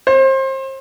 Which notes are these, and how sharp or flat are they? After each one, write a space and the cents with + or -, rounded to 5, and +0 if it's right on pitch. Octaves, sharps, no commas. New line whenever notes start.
C5 +30